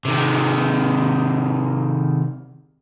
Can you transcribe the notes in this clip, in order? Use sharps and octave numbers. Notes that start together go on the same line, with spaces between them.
C3 D#3